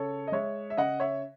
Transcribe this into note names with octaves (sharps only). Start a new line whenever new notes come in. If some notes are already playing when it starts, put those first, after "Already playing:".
Already playing: C#3 A4 C#5
D#5
G#3 C#5 E5
E5
C#3 D#5 F#5
C#5 E5